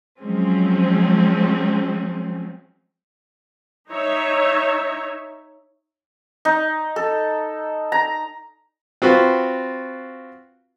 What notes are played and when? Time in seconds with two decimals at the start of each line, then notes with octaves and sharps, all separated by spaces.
0.20 F3 F#3 G#3 C4 C#4
3.90 D#4 C#5 E5
6.45 D#4
6.96 A4
7.92 A#5
9.02 C4 F4 F#4 B4